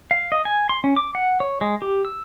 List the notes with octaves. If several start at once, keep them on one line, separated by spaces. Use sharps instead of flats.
F5
D#5
G#5
C6
C#4
D6
F#5
C#5
G#3
G4
E6